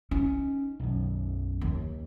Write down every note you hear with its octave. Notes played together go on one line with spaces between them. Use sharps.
C#4 D#4
B1 F#2
D#2